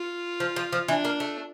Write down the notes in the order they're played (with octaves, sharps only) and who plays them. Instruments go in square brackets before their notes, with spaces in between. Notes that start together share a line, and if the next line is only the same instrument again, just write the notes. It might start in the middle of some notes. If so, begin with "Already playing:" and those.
Already playing: [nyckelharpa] F4
[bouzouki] F3
F3
F3
[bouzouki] E3 [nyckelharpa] D4
[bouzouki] A#3
A3